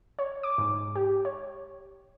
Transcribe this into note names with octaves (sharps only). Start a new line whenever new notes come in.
C#5
D6
G#2
G4
C#5